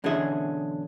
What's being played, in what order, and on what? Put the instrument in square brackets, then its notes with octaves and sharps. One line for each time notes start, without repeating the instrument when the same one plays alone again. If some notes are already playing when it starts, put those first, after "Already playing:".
[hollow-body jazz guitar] B1 D3 E3 C#4 G#4 E5